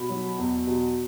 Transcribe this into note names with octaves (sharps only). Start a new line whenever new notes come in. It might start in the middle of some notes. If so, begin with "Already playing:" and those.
Already playing: B2 B5
F#3
E2
B2